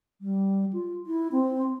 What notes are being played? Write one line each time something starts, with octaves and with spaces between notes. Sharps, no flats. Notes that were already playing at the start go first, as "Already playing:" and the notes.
G3
F4
E4
C4